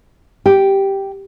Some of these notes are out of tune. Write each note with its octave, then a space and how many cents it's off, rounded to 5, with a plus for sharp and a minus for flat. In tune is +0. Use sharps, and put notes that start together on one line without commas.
G4 -5